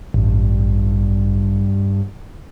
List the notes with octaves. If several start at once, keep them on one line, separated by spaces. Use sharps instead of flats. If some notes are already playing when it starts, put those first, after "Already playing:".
A1 G2